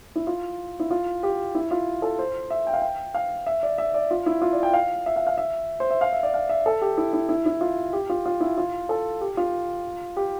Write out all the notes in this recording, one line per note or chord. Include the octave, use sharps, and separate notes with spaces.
E4
F4
E4
F4
G4
E4
F4
A4
C5
E5
G5
F5
G5
F5
E5
D5
E5
D5
F4
E4
F4
D5
G5
F5
E5
F5
F5
E5
C5
E5
F5
E5
D5
F5
E5
A4
G4
E4
E4
E4
E4
F4
G4
F4
F4
E4
F4
A4
G4
F4
G4